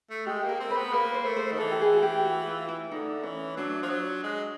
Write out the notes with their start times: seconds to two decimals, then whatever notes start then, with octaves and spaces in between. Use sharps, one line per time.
0.10 A3
0.26 G#3 G4
0.44 A#3
0.49 A#4
0.60 C4
0.71 B4
0.77 B3
0.93 A#3 B4
1.14 C5
1.25 A3
1.36 C5
1.52 D#3
1.58 E3 A4
1.71 G4
1.81 G#4
1.93 F#4
2.02 G4
2.25 F#4
2.47 F4
2.69 E4
2.91 D3 D#4
3.23 E3 C#4
3.57 F#3 D4
3.83 F3
3.89 F#3
4.24 G#3